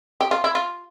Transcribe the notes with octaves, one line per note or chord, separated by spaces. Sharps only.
G4
F4
E4
F4